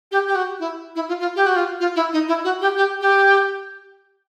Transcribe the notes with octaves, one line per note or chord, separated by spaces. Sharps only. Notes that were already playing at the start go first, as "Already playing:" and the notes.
G4
G4
F#4
E4
E4
F4
F4
G4
F#4
F4
F4
E4
D#4
E4
F#4
G4
G4
G4